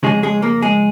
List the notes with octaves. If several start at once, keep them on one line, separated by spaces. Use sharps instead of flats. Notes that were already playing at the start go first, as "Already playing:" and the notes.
F2 C#3 G#3 G#4
G#3 G#4
A#3 A#4
G#3 G#4